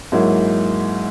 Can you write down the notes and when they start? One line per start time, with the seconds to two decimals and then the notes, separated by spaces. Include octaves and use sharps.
0.12 G#2 F#3 A#3 E4